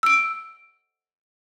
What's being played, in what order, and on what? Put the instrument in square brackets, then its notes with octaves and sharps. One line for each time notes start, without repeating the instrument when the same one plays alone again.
[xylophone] E6 D7